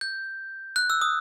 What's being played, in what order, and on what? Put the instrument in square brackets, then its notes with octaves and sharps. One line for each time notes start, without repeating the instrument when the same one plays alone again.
[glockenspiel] G6
F#6
E6
D#6